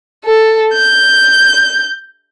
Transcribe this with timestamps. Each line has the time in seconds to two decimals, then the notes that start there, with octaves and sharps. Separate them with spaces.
0.24 A4
0.73 G6